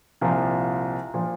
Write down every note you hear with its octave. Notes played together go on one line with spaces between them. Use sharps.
C2 A#2 F3
A#2 F3